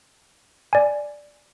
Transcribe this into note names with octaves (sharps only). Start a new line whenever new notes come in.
D5 G#5